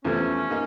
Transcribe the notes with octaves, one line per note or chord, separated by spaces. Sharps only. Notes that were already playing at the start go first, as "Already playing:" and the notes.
E2 C3 F3 A3 C4 C#4
A#3 D#4